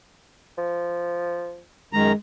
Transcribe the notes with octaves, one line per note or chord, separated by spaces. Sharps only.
F3
F#2 D#3 G#3 A#5